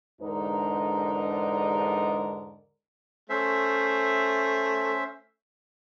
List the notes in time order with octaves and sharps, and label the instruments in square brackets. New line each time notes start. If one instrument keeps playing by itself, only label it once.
[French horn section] E2 G#2 D3 D4 D#4 A#4
[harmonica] A3 [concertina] C#4 C5 E5